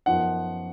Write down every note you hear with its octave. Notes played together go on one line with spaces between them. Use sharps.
F#2 F3 B3 D#4 F#5